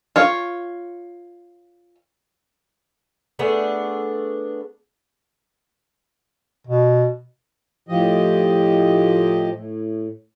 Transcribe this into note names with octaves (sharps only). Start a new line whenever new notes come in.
F4 C#5
A3 B3 D4 G#4
B2
A2 F3 F4 G4 D#5
A2